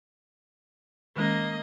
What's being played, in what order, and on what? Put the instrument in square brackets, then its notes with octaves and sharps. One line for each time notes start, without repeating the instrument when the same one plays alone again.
[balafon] D#3 G#3 C#4 [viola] A#3 D#5